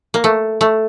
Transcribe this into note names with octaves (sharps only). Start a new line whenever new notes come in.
A#3
A3
A3